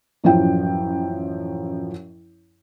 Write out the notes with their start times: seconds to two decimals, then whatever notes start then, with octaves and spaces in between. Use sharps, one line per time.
0.24 A1 F#2 F3 E4 G5